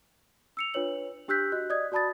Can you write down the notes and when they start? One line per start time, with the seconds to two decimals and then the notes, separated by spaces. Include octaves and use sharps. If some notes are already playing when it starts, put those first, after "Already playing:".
0.57 E6 C#7 F7
0.74 D4 F4 B4 C#5 F#7
1.28 D4 G4 E6 F#6 G6 B6
1.52 F#4 D#5 F#6
1.70 D5 D#5 D#6 G#6
1.92 F#4 D5 A5 B5 D#6 A6